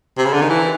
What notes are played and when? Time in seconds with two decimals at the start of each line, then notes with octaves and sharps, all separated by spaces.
0.18 C3
0.25 C#3
0.34 D3
0.42 D#3
0.50 E3